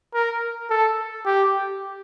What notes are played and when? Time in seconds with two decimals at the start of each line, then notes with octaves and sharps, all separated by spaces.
0.14 A#4
0.70 A4
1.26 G4